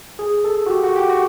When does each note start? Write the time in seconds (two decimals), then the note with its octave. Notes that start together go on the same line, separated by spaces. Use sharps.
0.19 G#4
0.44 A4
0.66 F#4
0.70 G4
0.83 F#4
0.96 G4
1.09 F#4